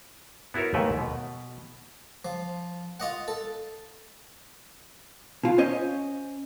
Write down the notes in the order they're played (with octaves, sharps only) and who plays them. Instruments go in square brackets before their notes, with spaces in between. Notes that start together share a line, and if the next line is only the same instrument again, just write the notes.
[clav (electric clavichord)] B3 E4 F#4 A#4 C#5
D#2 G#2 A3 B4 E5 G5
B2
[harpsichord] F3
F4 D#5 F#5
A4
[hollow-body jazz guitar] B2 F4
C#4 C5 C#5 D#5